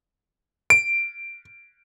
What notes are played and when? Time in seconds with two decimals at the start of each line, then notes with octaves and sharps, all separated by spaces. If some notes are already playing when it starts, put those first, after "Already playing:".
0.70 D7